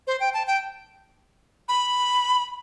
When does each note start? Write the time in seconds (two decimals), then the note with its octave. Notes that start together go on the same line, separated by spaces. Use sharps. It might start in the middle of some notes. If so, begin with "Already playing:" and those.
0.07 C5
0.20 G5
0.34 A5
0.47 G5
1.68 B5